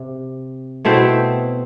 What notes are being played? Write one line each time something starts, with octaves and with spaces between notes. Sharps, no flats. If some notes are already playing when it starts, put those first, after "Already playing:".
Already playing: C3
B2 A3 C4 E4 C5 E5